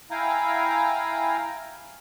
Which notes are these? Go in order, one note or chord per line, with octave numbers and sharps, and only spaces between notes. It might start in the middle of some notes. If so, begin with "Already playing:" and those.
E4 F5 G5 G#5 A#5